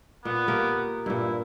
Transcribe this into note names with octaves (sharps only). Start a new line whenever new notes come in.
A#2 B3
A#3 G4 A#4
G2 A#2 E4